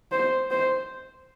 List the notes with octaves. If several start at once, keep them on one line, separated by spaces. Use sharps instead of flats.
C5
C5